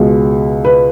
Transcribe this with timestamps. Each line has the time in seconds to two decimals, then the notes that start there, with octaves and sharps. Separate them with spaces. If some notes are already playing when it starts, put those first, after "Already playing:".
Already playing: C#2 B2 G#3
0.65 B4